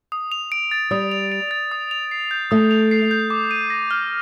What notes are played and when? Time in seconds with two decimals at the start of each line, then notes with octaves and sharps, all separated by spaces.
0.12 D#6
0.32 F7
0.52 D7
0.71 A6
0.91 G3 D#6
1.12 F7
1.32 D7
1.51 A6
1.72 D#6
1.91 F7
2.11 C7
2.31 G6
2.51 A3 D#6
2.71 F7
2.91 C7
3.11 G6
3.30 D6
3.51 D#7
3.70 A#6
3.91 F6